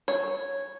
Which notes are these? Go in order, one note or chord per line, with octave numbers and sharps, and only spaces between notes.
C#5